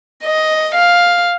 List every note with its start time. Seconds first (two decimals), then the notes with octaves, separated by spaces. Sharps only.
0.24 D#5
0.76 F5